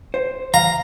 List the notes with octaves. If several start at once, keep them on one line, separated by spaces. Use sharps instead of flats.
C5
F5 A#5